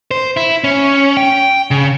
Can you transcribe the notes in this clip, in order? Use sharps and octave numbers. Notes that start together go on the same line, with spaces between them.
C5
E4
C#4
G5
C#3